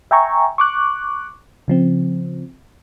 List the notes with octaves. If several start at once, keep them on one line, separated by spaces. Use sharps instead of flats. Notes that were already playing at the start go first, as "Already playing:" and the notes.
E5 G5 G#5 A#5 C#6
C#6 D6 F#6
C#3 F3 C4